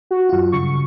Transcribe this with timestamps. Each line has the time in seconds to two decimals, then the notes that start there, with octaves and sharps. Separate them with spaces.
0.11 F#4
0.29 F#2 F4
0.52 G2 C#3 C#6